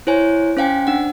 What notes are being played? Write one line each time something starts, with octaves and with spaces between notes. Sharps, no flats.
E4 C5 C#5 G#5
C#4 C5 F5 G5 G#5
D4 F#5